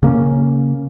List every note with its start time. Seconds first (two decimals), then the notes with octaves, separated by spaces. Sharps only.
0.03 C#3 A#3 B3 C#4